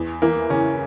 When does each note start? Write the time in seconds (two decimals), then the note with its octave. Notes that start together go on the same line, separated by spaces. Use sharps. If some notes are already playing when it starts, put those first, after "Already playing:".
Already playing: E2
0.22 E3 A#3
0.50 C#3 C#4